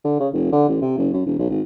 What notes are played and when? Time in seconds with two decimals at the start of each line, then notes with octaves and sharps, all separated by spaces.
0.04 D3
0.20 C#3
0.33 F1
0.52 D3
0.68 A1
0.81 C3
0.97 F#1
1.13 F#2
1.26 E1
1.39 B1
1.50 G#1